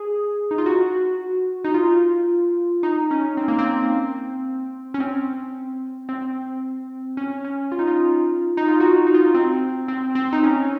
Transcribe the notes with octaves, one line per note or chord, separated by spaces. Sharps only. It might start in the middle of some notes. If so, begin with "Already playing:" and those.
Already playing: G#4
D#4
F4
F#4
D#4
F4
D#4
C#4
C4
A#3
C4
C#4
C4
C4
C#4
C#4
F4
D#4
F4
D#4
F4
F#4
D#4
F4
D#4
C4
C4
C4
D#4
C#4